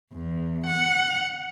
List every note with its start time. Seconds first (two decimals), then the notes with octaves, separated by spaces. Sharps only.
0.13 E2
0.67 F#5